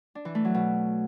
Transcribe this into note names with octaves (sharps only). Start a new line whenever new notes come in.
D4
E3
A3
F#3
B2